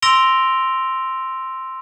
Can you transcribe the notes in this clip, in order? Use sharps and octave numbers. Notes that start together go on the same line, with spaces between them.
C6 E6 A#6 D7 F7 G7